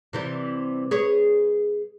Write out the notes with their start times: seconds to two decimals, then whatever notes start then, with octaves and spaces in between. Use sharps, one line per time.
0.13 C3 E3 G3
0.91 G#4 B4 C#5